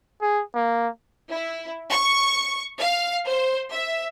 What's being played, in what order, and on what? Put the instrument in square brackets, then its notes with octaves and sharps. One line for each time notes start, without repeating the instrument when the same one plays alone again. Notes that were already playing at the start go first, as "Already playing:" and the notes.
[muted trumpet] G#4
A#3
[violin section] E4
C#6
F5
C5
E5